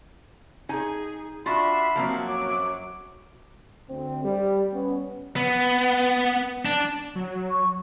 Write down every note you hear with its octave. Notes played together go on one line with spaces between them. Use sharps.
D#4 G#4 G#5
D4 F4 F#4 E5 B5 C6
F3 F#3 A#3 C4
F#2 D6
D2 C4
G3
B3 C#4
B3
D4
F#3
C#6